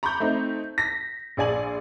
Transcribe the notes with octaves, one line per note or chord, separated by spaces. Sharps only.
A#5 B5 C#6 D6 G6
A3 C4 D#4
A#6 B6
A#1 G#4 D5 G#5 F#7